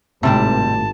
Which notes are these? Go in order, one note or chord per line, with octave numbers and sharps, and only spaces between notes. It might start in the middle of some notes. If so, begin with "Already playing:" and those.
G#1 A2 C3 G3 C4 A5